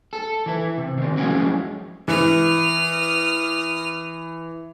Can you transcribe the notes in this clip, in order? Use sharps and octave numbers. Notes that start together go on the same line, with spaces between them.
A4
E3 E4
C3
D#3 C4
F3 F#3 G#3 C#4 E4
E3 D#6 F6